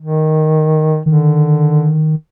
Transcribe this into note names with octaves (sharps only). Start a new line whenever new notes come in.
D#3
D3 D#3